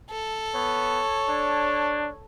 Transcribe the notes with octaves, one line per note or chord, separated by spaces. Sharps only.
A4
B3 C#5
D4